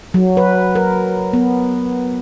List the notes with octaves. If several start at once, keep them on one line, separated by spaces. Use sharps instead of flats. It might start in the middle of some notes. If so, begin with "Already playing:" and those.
F#3
B4
A#4
B3